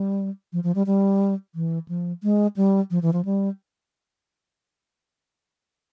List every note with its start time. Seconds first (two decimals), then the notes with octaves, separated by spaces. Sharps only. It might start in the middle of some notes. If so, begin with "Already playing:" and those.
Already playing: G3
0.53 F3
0.64 F3
0.75 G3
0.87 G3
1.55 E3
1.88 F3
2.23 G#3
2.56 G3
2.91 F3
3.02 E3
3.13 F3
3.25 G3